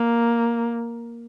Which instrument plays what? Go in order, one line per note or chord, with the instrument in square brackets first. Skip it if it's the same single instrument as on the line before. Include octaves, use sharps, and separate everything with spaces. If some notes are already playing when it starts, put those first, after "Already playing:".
Already playing: [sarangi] A#3